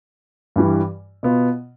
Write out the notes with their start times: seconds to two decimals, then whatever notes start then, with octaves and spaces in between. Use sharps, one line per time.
0.56 G2 E3 G3
1.23 B2 B3 F4